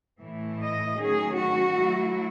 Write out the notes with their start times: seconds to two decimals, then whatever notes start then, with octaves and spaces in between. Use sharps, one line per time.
0.20 A2 E3 A3 E4
0.60 D#5
0.98 D#3 F#3 A3 C#4 G#4
1.38 F#4
1.77 F#3 A3 E4